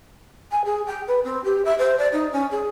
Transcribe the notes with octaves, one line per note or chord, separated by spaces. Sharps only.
G#5
G#4
G5
B4
C4
G4
E5
C5
D5
D#4
C#4
G#4